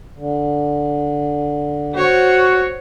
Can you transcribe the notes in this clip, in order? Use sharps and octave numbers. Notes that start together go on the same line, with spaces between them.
D3
F#4 C5 C#5